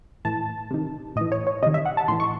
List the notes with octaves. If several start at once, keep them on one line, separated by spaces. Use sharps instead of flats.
A2 E3 A5
C3 D#3
A2 D#5
E3
C#5
C#5
C3 D#3 D#5
E5
F#5
A5
A2 E3 C6
C#6